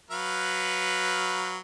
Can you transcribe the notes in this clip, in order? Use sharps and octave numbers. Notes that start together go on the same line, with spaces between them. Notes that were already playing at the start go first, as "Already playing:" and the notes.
F#3 B4 F5